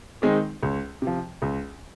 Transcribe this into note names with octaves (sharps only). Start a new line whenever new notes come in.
D#3 G#3 C4 D#4
C#2
C3 F3
C#2